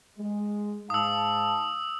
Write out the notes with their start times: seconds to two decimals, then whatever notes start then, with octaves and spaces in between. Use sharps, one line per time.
0.18 G#3
0.90 G#2 F5 A5 D#6 E6